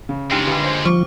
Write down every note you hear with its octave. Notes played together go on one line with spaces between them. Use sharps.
C#3
A#2 G#3 D4 D#4 G4
D3 D4 B4
C5
F3 C5 C#6 D6